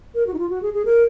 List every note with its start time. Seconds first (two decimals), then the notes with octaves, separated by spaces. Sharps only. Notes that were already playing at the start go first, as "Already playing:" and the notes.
0.15 A#4
0.27 F#4
0.34 D#4
0.39 F4
0.49 F#4
0.62 G#4
0.74 G#4
0.85 A#4